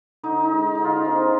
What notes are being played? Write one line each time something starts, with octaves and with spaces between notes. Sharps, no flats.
D3 D#4
D#4
G#3
D3 D#4
F4
C4 G#4